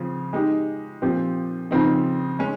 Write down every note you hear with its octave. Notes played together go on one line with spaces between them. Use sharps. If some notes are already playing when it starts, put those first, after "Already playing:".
Already playing: C#3 F3 C4
G#3 D#4 G4
A#2 F3 C4 G4
C#3 F3 C4 D#4
G#3 C#4